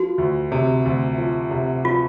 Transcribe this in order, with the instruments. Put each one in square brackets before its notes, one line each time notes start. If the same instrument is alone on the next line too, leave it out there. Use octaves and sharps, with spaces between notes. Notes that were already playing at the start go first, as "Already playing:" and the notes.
Already playing: [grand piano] F3 [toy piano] F#4
[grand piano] D2
C3
D2
F3
C3
[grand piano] F3 [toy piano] F4